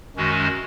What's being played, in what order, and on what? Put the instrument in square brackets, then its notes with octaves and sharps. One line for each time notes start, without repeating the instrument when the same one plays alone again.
[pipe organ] F#2 D#3 G#3 C#4 F#4